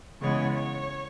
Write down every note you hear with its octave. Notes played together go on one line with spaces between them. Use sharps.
C#3 E3 G#3 B3 C#5
C#5